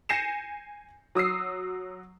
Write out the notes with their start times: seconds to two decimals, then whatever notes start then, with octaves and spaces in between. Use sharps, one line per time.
0.09 G#5 G6 A#6 C7 C#7 E7
1.15 F#3 D#6 E6 C7